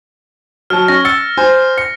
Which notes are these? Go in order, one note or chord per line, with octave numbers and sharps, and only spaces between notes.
F#3 A5 F6
C#4 A#6
E6 A6 C#7
C5 G#5
C#7